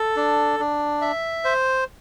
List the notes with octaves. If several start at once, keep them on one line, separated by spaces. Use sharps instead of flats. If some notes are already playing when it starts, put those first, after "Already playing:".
Already playing: A4
D4
D4
E5
C5